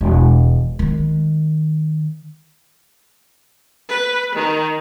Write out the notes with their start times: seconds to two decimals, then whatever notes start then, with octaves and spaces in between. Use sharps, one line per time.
0.01 E1
0.79 D#3 G#3
3.89 B4
4.35 D#3